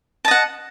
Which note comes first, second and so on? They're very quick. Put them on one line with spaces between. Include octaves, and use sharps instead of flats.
A5 D#5 F#5